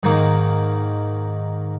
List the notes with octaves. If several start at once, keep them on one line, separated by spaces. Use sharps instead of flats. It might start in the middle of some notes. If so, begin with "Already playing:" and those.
G#2 D#3 A#3